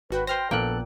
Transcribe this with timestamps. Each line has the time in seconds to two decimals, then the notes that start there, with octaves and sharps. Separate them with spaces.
0.10 G#1 F#4 B4 G5
0.27 B4 C5 G5 C6 F6 A#6
0.51 A#1 A#2 A#3 B3 A4 G5 F#6